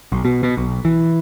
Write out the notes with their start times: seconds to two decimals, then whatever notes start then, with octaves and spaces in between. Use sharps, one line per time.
0.12 B1
0.25 B2
0.43 B2
0.57 B1
0.85 E3